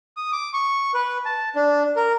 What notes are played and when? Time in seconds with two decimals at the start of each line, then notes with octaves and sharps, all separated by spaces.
0.17 D#6
0.32 D6
0.53 C#6
0.94 B4
1.25 A5
1.56 D4
1.96 A#4